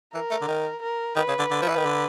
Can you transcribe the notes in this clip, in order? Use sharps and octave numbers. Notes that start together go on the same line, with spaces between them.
E3 A#4
A3
D3
D#3
A#4
D#3 B4
C#3
D3
D3
F3
E3
D#3
D3